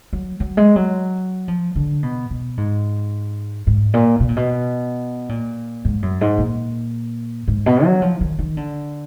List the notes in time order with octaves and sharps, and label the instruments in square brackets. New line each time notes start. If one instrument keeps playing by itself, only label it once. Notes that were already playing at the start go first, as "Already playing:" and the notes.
[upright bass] F#3
F#3
G#3
F#3
F3
D3
B2
B2
G#2
G#2
A#2
B2
A#2
B2
A#2
G#2
F#2
G#2
A#2
G#2
B2
F#3
F3
D#3
D#3
D3